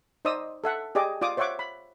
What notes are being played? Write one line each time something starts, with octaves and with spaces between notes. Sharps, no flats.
D#4 C5 D5 D#5 D#6 E6
A4 E5 F#5
G4 G#4 D5 D#5 D6
F4 D5 D6 D#6
C5 C#5 E5 F#5 C#6 D6
B5